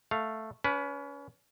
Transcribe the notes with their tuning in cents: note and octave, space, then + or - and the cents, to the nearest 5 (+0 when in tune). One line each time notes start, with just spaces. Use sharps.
A3 +0 F5 +0
C#4 +30 B4 +0